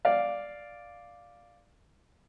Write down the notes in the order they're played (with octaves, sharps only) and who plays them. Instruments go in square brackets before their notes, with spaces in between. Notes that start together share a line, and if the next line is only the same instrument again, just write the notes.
[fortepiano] D5 F5